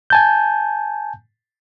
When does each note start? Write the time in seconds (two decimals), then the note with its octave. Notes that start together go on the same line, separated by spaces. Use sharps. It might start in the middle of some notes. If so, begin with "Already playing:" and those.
0.10 G#5 A5 G6